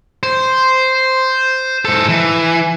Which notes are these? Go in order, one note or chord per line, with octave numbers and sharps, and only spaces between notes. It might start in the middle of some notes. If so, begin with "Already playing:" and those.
C5
G#2 A4
E3